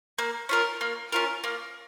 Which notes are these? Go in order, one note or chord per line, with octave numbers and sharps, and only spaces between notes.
A#3
C#4 F4 A#4
A#3
C#4 F4 A#4
A#3